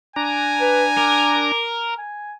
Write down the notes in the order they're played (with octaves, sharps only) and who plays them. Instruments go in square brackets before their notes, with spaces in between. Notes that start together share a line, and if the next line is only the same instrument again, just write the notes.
[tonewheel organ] D4 A#5 [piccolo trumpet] G#5
[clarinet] B4
[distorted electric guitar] A#4 [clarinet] D6
[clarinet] G#5